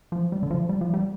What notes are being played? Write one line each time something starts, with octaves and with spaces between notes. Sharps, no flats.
F3
G3
D3
F3
G3
F3
G3